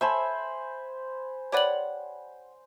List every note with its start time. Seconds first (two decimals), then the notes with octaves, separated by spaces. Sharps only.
0.01 A4 C5 C#5 E5 G#5 B5
1.52 G4 B4 C#5 D5 F#5 F#7